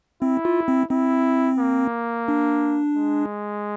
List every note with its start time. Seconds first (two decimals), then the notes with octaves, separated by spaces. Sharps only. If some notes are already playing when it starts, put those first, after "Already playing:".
0.22 C4 E4
0.45 F4
0.68 C4
0.90 C4 E4
1.59 A#3
2.28 D4
2.97 G#3